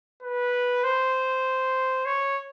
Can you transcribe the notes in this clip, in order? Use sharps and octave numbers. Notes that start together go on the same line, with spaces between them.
B4
C5
C#5